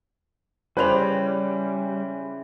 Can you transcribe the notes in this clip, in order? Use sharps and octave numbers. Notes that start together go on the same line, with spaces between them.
C#3 E3 G3 G4 B4 C5 F7